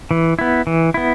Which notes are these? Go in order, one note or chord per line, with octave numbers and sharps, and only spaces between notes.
E3
B3 E4
E3
B3 E4